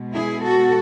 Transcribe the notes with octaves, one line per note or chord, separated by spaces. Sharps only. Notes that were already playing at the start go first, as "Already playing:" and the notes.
Already playing: B2 G#3 B3
E4 G#4
F#4 A4